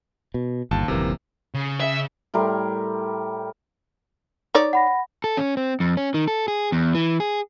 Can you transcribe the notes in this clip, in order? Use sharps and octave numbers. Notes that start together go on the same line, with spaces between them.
B2
G1 D#2 A5
D#1 A#1 C3 E3 A#3
C#3
E5
A2 G3 A#4 C6
D#4 C#5 D5
F#5 B5 A#6
A4
C#4
C4
F2
C#4
D#3
A4
G#4
E2
E3
G#4